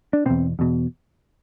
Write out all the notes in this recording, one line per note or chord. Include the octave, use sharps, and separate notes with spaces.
D4
E2 B2 C4
E2 B2